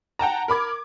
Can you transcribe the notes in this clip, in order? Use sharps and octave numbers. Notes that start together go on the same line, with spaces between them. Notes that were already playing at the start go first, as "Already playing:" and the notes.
F#5 G5 A5 A#5
A#4 B5 D6 G#6